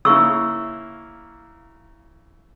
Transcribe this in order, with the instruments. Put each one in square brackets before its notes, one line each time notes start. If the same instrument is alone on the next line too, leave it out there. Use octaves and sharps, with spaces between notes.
[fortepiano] C#3 A#3 E4 [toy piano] C#6 E6